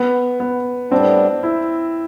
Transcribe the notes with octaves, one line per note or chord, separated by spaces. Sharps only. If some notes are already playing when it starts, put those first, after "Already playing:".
Already playing: B3
B3
A2 G3 B3 C4 D4
E4